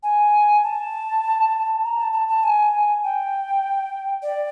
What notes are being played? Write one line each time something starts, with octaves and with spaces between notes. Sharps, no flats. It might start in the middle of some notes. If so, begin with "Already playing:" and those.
G#5
A5
A#5
A5
A5
A5
G#5
G5
D5